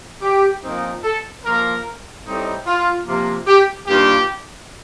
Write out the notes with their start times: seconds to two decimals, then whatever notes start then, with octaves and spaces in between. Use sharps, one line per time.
0.22 G4
0.63 A#2 F3 C4 D#4
1.03 A4
1.44 F3 A#3 F4 A#4
2.25 A2 G3 C4 D#4
2.66 F4
3.06 C3 F3 A#3
3.46 G4
3.87 G2 D#3 A#3 F4 G4